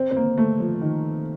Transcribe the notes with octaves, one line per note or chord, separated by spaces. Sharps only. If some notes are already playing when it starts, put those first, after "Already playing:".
Already playing: C4
C4
A#3
A3
F3
D#3